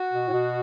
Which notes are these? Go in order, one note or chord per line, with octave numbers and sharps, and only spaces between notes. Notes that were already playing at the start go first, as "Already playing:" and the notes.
Already playing: F#4
B2
A2
B2